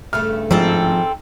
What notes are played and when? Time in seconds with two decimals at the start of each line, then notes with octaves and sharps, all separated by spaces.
0.13 G2 C#3 A3 F6
0.51 G#1 F3 C4 A4